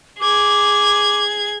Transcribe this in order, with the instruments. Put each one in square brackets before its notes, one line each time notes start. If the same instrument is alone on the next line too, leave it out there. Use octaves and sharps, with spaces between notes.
[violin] G#4 G#6 [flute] D6